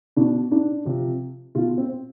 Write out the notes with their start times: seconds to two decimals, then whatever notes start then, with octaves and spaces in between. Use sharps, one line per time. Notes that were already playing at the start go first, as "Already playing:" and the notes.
0.16 B2 D4
0.51 D4
0.85 C3 F3
1.55 B2 F4
1.78 C4